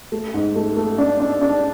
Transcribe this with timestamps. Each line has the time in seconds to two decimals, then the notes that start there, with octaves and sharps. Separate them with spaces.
0.12 A3
0.34 G#2
0.56 A3
0.77 A3
0.98 D4
1.20 D4
1.41 D4